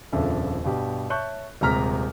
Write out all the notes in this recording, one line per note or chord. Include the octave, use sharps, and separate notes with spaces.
D#1 F2 C#3 D4 A4 E5
G2 B2 G4
C#5 E5 A5 C#6 F#6 G6
D#1 C3 G#3 A#5 F6 B6